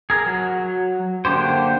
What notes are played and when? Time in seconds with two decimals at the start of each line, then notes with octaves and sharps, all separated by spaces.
0.10 G#4 A#4
0.26 F#3
1.25 D3 A#3 D4 G4 C5